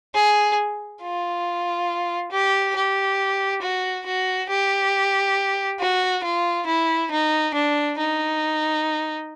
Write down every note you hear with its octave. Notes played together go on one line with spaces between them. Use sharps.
G#4
F4
G4
G4
F#4
F#4
G4
F#4
F4
E4
D#4
D4
D#4